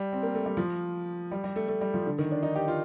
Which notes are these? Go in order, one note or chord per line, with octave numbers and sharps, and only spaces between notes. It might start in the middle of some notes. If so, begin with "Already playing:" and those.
Already playing: G3
C4
A#3
A3
G3
F3
G3
G3
A3
A3
G3
F3
D3
D#3
D4
D#4
G4
F4